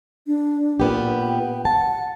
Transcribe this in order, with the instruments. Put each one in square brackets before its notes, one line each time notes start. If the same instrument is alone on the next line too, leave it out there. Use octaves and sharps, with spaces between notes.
[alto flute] D4
[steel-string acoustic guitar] A#2 B3 G4
[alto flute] G5
[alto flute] F#5 [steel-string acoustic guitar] A5